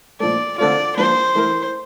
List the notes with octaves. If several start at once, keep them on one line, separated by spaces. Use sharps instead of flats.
A#2 F3 A3 D5
D3 A3 C4 F4 D5
F3 A#3 D4 C5
E3 A3 E4 A#4